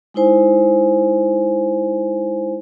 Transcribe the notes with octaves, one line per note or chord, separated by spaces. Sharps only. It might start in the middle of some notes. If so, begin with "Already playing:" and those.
G#3 D#4 E4 C5 G#5